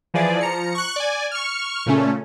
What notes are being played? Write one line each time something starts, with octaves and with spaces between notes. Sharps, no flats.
E3 F3 G#4 D5
F3 A#5 C#7
C#6 F#6
D5 G#5
C#6 F6
A#2 C#3 A3 C#4